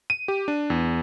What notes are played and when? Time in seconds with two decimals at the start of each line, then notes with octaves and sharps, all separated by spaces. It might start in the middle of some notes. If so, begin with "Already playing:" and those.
0.10 D#7
0.28 G4
0.48 D4
0.70 E2